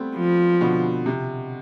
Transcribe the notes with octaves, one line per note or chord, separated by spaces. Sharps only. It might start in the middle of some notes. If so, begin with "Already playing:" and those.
Already playing: G3 A3 B3 C4
F3
B2 D3
C3